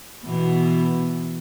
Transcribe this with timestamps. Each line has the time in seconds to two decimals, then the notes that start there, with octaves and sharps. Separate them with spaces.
0.25 B2 E3 B3